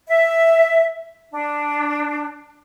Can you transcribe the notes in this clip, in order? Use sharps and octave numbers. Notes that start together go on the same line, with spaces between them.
E5
D4